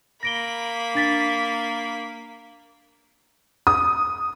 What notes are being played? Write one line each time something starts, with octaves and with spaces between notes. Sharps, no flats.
A#3 B5 A#6 D7 G7
D4 A6 B6
D#6